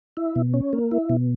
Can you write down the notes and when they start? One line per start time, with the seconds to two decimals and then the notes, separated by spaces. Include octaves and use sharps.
0.17 E4
0.36 B2
0.54 C#4
0.73 A#3
0.91 E4
1.09 B2